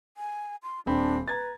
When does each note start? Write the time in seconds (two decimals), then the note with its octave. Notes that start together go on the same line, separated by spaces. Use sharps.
0.17 G#5
0.63 C6
0.86 D#1 C4 D4 B5
1.28 B4 A#5 G#6 A6